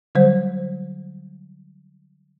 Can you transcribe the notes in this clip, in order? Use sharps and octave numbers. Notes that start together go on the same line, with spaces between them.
D3 F#3 G3 C5